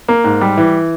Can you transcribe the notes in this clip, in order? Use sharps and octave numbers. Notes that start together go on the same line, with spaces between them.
A#3
G#2
G3
E3